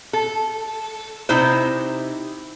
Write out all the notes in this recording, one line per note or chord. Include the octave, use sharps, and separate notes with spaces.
A4
C3 D#4 E4 C5